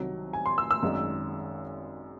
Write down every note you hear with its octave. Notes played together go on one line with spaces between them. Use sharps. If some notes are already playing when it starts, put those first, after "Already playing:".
Already playing: C2 C3 D#3 F#3
G#5
C6
E6
E6
G#1 F#2 D#3 G#3